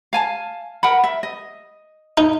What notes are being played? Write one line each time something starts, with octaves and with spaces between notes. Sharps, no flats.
F5 G#5 A5
A#4 F#5 B5
E5
D#5
D#4